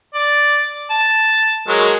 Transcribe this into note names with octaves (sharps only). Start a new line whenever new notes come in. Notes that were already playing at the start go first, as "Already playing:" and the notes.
D5
A5
F#3 G#3 A#4